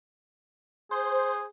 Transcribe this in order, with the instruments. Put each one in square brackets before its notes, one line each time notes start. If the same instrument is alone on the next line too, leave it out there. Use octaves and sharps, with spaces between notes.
[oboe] G#4 [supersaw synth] C5